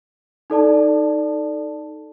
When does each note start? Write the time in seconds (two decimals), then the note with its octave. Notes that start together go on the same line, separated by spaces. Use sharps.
0.50 D#4 A4 D5 A5